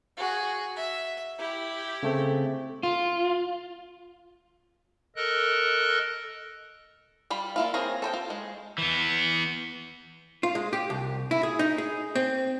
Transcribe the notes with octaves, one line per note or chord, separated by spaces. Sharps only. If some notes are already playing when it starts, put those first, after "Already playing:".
F#4 G#4
E5
E4 G4
C#3 A3 C4
F4
A4 A#4 D#5 F#6
G3 F4 B5
A#3 E4 F4
C4 G#4 A#4 C#5 A#5
A4 C5 G5
F4
G#3
E3 B3
F4
G#3
G4
C2
E4
G#4
D#4
G#4
C4